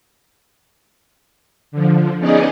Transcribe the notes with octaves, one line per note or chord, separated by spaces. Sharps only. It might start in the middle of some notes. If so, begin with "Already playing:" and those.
D3 F3
B3 C#4 D#4 G#4 D5 D#5